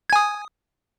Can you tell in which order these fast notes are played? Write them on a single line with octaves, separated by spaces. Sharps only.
G#6 G#5 D#6